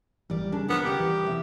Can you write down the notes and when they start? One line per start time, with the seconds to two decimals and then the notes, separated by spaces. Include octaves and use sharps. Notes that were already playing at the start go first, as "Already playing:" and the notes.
0.30 A1 G3 A#4 D5
0.52 C#3 D4
0.69 D#2 F3 B3 A#4
0.85 D1 C#3 G3 G4
0.98 E3 G3
1.27 E2 C3 G3 E5